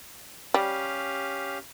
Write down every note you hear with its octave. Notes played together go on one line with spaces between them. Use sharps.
G3 C#4 G4 F5